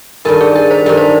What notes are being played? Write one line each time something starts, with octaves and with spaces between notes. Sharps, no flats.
G2 D#3 G3 A#4
G#4
A#4
C5
G2 D#3 G3 A#4
C5